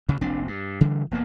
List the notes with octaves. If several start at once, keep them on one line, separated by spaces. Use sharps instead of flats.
D2 C#3
F1 A#1 C4 D4
G2
C#3 E3 G3
E1 A#3 B3